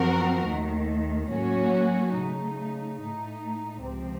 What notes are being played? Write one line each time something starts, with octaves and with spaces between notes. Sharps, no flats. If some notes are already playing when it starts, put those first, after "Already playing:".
Already playing: F#2 F3 C4 F#4 A#4
D#2 D#3 A3
A2 F#3 A#3 C#4 F#4
C#3 A3 D#4
A2 A3 D#4
C#2 C3 F3 C4